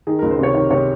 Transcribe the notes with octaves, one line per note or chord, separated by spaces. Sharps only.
D#3 G#4
C#2 A#4
C5
C3 C#5
D#3 C#5
C3 C#5